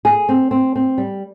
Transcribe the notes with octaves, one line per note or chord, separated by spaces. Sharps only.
G#4
C4
C4
C4
G3